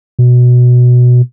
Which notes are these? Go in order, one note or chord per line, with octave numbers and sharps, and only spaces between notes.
B2